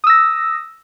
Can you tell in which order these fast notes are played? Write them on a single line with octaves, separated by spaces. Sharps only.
D#6 E6 A#6